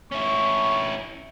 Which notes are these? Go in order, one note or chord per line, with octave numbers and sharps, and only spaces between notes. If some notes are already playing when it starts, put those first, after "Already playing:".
C#4 E4 C#6